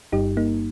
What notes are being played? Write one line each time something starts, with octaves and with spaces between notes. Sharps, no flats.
G1 G2 G3 D#4 G4
A#3 D#4